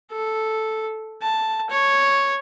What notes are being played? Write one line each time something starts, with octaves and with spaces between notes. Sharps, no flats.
A4
A5
C#5